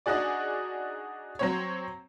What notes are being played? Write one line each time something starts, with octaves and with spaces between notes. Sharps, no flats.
D4 D#4 F#4 G#4 D5
F#3 C4 C#5